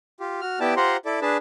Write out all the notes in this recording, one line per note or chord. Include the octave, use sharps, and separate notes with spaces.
F4 G4
F#4 F6
B3 E4 G4 D5 G5 A5
F4 G4 C5 F#5 A#5 C6
E4 A4 D5
D4 G#4 B4 A5